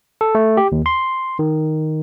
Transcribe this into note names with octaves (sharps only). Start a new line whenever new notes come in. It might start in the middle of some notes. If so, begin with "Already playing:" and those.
A4
A3
G4
D#2
C6
D#3